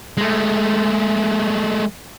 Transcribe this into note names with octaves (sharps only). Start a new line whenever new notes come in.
G#3 A3